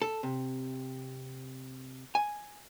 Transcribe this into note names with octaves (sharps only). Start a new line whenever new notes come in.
A4
C3
G#5